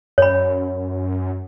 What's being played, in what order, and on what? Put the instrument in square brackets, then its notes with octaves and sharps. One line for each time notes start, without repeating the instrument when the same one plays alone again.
[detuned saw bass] F#2 [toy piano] C#5 B5